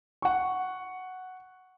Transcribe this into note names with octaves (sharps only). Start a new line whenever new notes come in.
F#5 C#6